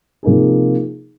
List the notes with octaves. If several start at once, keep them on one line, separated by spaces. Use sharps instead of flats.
C3 F3 A#3 D#4 G#4